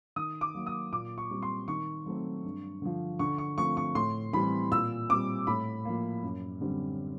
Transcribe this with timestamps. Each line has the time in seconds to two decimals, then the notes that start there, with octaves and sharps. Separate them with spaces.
0.16 D#3 D#6
0.41 D6
0.55 F#3 A#3
0.66 D#6
0.93 A#2 D6
1.18 C#6
1.31 G3 C4
1.42 C6
1.68 D#3 C#6
2.06 F#3 A3 C4
2.44 G2
2.82 D3 F3
3.19 D3 C#6
3.38 C#6
3.57 F3 A3 C4 C#6
3.77 C#6
3.95 A2 C6
4.33 E3 G3 C4 B5
4.71 A#2 E6
5.09 G3 C4 D6
5.47 A2 B5
5.85 F3 A#3
6.23 F#2
6.61 D3 G3 C4